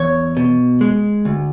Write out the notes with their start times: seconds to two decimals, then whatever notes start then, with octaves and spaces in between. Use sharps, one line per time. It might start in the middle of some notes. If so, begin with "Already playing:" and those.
Already playing: E2 C#5
0.37 B2
0.81 G#3
1.25 D2